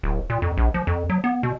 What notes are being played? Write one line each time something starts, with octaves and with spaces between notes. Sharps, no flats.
D1
A#2
F2
A#1
F3
F2
F#3
B3
B2